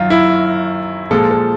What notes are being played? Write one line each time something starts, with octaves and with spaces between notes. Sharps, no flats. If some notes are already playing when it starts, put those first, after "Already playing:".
Already playing: F#2 D#3 F#3 F4
E4
A#2 F3 G#3 A4
A4